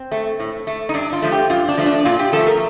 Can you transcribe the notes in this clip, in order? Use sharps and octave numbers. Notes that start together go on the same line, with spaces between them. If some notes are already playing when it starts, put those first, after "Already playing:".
Already playing: C4
A3
A2
A3
D#4
G2 D4
F4
F3 A3
G4
G2 F4
D4
F3 A3
D4
A#2 F4
G4
F3 A3 A4
A#4